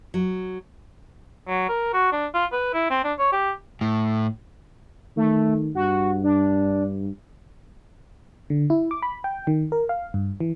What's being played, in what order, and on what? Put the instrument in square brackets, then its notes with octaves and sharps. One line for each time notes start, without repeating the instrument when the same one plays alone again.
[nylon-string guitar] F#3
[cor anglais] F#3
A#4
F#4
D4
F4
B4
E4
C4
D4
C#5
G4
[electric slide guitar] A2
[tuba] D#3 [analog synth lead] A3
[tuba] G2 [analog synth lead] F#4
[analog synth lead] D4
[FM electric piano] D3
E4
D6
B5
G5
D#3
A#4
F5
G2
E3